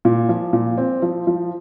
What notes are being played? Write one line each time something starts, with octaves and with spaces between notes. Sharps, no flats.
A#2
F3
A#2
C4
F3
F3